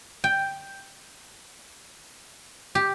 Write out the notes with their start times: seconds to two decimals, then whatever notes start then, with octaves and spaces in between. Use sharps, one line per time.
0.24 G5
2.75 G4